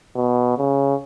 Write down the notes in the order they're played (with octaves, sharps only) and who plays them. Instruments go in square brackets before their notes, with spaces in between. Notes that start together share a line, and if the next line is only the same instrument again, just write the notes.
[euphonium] B2
C#3